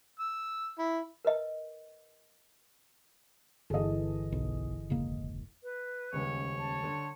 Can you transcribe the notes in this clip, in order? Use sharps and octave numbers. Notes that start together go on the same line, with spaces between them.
E6
E4
A#4 B4 D#5
G1 E3 G#4 A4 D#5
B1
E1 C#3 A#3
B4
D#1 C#2 C#5
A5
D3